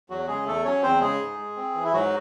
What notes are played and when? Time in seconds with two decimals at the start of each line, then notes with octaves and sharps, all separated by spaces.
0.10 E2 F#3 F#4
0.28 C#3 G#3 G#4
0.46 E2 A3 A4
0.64 F#3 C#4 C#5
0.83 E2 C4 C5
1.01 C#3 G#3 G#4
1.21 G#2
1.39 G#3
1.56 C4
1.75 E3
1.84 E4
1.93 G#2 F#3 F#4